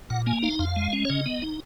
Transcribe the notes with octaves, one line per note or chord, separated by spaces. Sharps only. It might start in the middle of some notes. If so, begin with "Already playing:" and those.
A#2 F#5
A#3 G#5
D#4 F5
F2 F5
G#3
C#4
C#5
C#3 D#5
B3
D#4